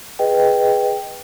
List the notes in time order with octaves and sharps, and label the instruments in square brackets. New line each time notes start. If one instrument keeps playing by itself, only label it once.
[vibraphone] G#4 B4 D#5 G5